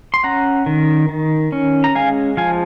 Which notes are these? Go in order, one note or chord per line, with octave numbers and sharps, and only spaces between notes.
C6
C#4 F#5 A#5
D#3
D#3
C#4
A#5
G#3 F5 G#5
F3 F5 G#5